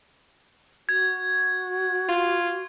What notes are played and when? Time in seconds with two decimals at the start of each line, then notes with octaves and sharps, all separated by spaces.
0.89 F#4 G#6
2.09 F4